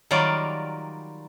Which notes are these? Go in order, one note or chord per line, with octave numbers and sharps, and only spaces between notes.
D#3 F#3 G3 F4 A#4 D5